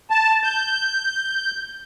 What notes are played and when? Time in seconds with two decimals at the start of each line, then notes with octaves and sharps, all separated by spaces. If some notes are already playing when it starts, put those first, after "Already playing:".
0.10 A5
0.44 G6